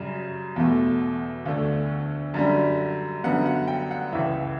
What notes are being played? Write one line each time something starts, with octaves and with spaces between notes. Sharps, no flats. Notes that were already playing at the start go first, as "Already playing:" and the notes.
Already playing: F#2 C#3 G3
E2 B2 A3
D2 D3 A3
F#2 D3 G3
F#2 D3 G3 B3 F#5
F#5
G5
F#5
C#2 C#3 E3 E5